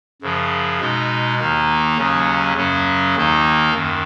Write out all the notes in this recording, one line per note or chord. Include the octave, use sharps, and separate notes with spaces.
F#2 C#3 F3
B2 G#3 D#4
D#2 D#3 A#3 D#4
D#2 C#3 F#3 C#4
F#2 C#3 F#3 C#4
D#2 D#3 A#3 D#4
F#2 D#3